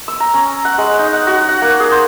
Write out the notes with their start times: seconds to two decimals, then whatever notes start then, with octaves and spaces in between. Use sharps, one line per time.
0.08 E6
0.20 A#5
0.34 C#4
0.65 F#5
0.78 G#3
0.99 D#4
1.13 F#5
1.27 F#4
1.49 F#5
1.62 A#3
1.80 G#4
1.92 C5